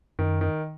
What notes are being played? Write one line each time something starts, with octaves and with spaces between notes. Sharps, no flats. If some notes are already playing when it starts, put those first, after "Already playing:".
F#2 D#3
D#3